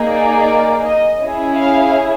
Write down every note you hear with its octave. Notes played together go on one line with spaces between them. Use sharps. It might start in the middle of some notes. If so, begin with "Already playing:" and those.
Already playing: A#3 D#4 G#4
D5
D#5
C#4 E4 G#4
F5